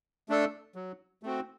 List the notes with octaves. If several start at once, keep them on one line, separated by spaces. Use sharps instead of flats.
A3 D4 A4
F#3
A3 C4 F#4